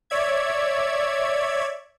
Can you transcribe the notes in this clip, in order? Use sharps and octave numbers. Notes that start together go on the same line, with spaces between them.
C#5 D5 E5 G#6